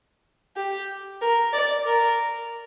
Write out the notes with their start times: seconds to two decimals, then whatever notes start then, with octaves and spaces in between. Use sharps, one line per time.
0.56 G4
1.22 A#4
1.53 D5
1.86 A#4